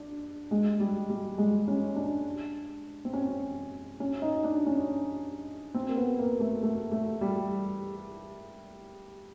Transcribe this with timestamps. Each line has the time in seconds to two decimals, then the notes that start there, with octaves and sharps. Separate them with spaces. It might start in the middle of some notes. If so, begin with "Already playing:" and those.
Already playing: D4
0.51 G#3
0.80 G3
1.10 G3
1.38 G#3
1.68 C#4
1.96 D4
3.05 C4
3.13 C#4
4.00 C#4
4.22 D#4
4.44 D4
4.66 C#4
5.74 C4
5.89 A#3
5.97 B3
6.19 A#3
6.40 A3
6.63 A3
6.91 A3
7.21 G3